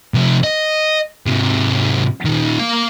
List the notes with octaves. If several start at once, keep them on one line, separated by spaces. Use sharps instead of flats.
C3 F3
D#5
G#2 C3
A#2 D#3
A#3 F5